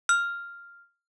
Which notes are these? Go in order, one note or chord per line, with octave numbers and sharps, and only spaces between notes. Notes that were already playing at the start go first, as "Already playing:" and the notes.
F6